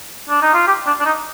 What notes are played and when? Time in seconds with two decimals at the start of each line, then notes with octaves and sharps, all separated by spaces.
0.29 D4
0.42 D#4
0.54 F4
0.67 G4
0.87 D4
1.00 D4
1.05 D#4